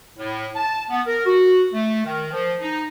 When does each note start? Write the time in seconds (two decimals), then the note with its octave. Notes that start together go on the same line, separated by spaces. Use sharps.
0.18 A2
0.56 A5
0.90 B3
1.06 A#4
1.26 F#4
1.74 A3
2.05 D#3
2.32 F3
2.61 D#4